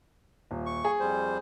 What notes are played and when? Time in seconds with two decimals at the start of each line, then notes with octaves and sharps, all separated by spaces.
0.51 D#1
0.66 C#6
0.85 G#4
1.00 F2 G3 C5